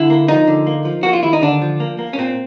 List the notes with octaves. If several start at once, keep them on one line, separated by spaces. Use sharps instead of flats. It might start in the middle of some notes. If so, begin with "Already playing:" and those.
Already playing: D3 E4
A#3
F3 D#4
D3
A#3
F3
A#3 F#4
F4
D#2 E4
D#4
D3 D4
F3
A#3
A#3
C#4
A#2 C4